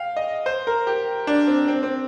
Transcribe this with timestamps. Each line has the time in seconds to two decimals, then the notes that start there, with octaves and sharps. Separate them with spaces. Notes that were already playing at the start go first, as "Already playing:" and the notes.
Already playing: F5 G5
0.17 D#5
0.46 C5
0.67 A#4
0.87 G4
1.27 D4
1.47 C4
1.68 C4
1.83 C4